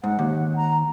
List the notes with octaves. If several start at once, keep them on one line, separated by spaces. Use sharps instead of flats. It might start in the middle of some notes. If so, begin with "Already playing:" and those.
G#2 F#5
D#2
A#5